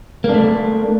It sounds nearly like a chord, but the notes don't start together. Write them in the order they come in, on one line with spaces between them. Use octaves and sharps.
A#3 D4 A3